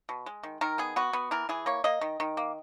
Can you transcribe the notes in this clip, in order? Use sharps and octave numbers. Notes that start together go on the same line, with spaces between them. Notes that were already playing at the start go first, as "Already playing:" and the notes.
B2
G#3
D#3
D#3 A#4
B3 G#4
B3 F#4
B3
E3 A#4
E3 G#4
A#3 C#5
A#3 D#5
D#3
D#3
A#3